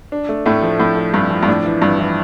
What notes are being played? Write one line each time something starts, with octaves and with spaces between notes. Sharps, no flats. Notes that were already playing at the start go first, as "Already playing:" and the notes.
D4
A3
A2 A3
F3
A2 F3
A3
G2 A3
F3
G2
A2 D4
E3
G2 E3
E3